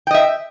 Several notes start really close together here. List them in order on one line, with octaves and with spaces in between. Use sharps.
G5 D#5 E5